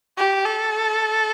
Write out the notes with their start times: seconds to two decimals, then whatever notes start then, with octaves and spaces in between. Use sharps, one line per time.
0.18 G4
0.45 A4